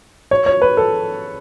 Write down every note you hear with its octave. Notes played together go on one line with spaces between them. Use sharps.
C#5
C#5
B4
A4